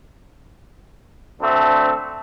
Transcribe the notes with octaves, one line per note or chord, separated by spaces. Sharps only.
D2 A3 C4 D4